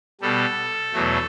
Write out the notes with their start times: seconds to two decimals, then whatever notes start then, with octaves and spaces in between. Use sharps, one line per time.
0.21 B2 G3 A4
0.93 E2 B2 F#3 A3